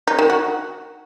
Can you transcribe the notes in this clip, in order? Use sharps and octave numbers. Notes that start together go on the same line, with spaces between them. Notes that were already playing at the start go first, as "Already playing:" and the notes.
D#4
D#3
F#4